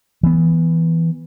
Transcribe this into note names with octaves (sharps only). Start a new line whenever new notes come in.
E3 B3